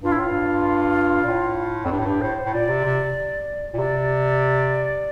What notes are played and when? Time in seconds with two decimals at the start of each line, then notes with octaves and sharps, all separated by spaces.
0.03 G2 F4
0.12 E4
0.17 A2 F4
0.30 G2
1.23 A#2
1.28 A2
1.85 F2
1.91 G2 G4
1.99 A2
2.06 G2 G4
2.22 A2 C5
2.38 C5
2.45 A2
2.53 A#2 D5
2.69 C3
2.85 C3
3.74 A#2
3.78 C3 D5